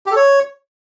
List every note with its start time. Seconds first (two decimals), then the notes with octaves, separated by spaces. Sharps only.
0.06 G4
0.11 A4
0.16 C#5